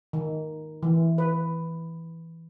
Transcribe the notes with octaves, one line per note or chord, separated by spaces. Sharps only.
D#3
E3
B4